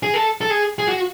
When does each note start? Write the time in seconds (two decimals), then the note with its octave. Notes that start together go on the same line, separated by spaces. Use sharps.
0.03 G#4
0.14 A4
0.41 A4
0.50 G#4
0.78 G#4
0.88 F#4